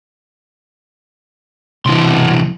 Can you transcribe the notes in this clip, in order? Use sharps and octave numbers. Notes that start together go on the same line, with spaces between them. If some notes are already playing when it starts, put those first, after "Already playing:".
C2 B2 E3 C6